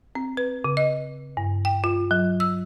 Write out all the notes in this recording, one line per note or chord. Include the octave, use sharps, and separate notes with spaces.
C4
B4
C#3
D#5
G2
G5
F4
F#3
E6